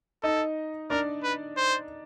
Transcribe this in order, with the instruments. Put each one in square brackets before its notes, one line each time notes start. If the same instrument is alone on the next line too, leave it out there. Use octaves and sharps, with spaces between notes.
[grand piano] D#4 D#5 [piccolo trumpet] A4
[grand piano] D4 D5 [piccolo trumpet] A#4
[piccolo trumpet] B4
C5